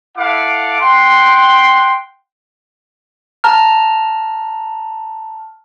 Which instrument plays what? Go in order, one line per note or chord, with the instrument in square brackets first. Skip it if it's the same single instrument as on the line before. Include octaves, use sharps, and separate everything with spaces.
[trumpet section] E4 A4 F5 F#5 D6
F#5 G5 C6
[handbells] A5 A#5 F6